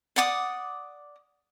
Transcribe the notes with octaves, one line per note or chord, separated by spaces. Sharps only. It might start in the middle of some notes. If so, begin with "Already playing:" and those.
D5 F#5 D6 D#6